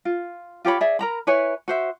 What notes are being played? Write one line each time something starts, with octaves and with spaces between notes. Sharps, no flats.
F4
F4 G4 C#5 B5
G#4 D5 E5
A#4 A#5 B5
E4 B4 C#5 G#5
F#4 C5 E5